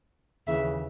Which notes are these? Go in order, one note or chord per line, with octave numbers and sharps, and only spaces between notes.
D#2 C#3 E3 E5